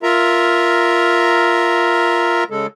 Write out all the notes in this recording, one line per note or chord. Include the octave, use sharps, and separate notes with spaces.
F4 A#4 E5 A#5
C#3 G#3 A4